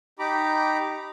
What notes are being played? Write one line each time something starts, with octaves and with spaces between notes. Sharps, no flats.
D#4 G4 A#5 B5 D6